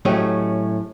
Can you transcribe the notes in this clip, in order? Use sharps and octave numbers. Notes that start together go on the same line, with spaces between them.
A2 F#3 A3 C#4 G4 D#5